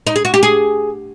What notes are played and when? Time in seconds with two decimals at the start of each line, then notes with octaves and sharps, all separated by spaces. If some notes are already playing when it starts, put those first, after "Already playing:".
0.07 D#4
0.16 G#4
0.25 F#4
0.34 G4
0.43 G#4